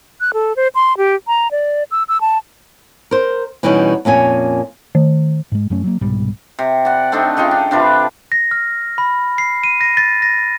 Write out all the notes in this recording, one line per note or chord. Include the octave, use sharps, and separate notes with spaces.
F#6
A4
C5
C6
G4
A#5
D5
E6
E6
A5
A#4 C5
B2 E3 G3 C#4 D#4 F#4
F2 A#2 C#4 G#5
D#3
G#2 G#3
F#2 F#3 A3 C#4
F#3 A#3
C2 G#2 B2 G3
C3
D5 F#5
A3 C4 D4 D#4
C#3 D#4 F4 G5
D4
C3 D4 F4 B4
A#6
F6
B5
C7
D#7
A#6
A6
A#6